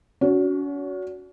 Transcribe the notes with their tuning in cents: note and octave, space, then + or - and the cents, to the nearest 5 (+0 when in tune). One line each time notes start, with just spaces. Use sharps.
C#4 +40 F#4 +0